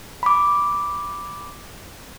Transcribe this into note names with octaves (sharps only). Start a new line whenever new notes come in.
B5 D6